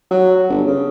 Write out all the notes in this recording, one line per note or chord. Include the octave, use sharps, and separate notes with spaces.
F#3
G1
C#3